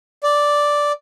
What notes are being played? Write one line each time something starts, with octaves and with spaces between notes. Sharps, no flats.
D5